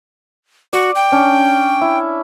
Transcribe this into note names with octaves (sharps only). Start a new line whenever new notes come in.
F#4 D5
G5
C#4 D4
E4